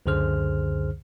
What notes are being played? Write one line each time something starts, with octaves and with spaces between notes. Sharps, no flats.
C#2 F#2 D3 G#4 C5 F6